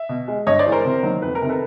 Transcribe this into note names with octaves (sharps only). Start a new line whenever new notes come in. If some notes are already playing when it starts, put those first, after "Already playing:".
Already playing: E5
B2
G#3
G2 C#5 D#5
C5 D5
E3 G#3
A#4 C5
C3
D#3 F#3 A#3
F2 B4
A#4
C3 D#3
A4 B4